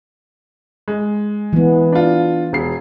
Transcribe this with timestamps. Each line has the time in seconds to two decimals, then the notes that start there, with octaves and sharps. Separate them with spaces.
0.88 G#3
1.53 E3 B3
1.92 D4 F4
2.53 E1 C7